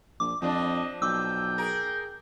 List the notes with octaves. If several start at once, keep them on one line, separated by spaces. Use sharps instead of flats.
A#1 D6
F2 F3 D4 D#5
B1 G5 D6 E6
G#4 A#4